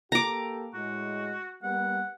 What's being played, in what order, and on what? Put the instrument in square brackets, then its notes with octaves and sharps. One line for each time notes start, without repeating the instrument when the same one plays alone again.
[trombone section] A#3 G4 A4 [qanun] A#5 D6
[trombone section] A2 G#3 [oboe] F#4
[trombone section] G3 A#3 B3 [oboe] F#5